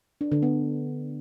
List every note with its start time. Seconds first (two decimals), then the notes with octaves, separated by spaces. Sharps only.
0.21 D4
0.32 D3
0.42 B3